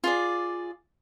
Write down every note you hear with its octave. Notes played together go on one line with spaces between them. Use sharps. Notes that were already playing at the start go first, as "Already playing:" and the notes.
F4 G#4 D5